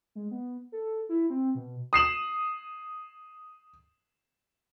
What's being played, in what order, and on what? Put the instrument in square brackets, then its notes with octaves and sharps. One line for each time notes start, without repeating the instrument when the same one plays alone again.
[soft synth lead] G#3
B3
A4
E4
C4
B2
[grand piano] D#6 C7 E7 F#7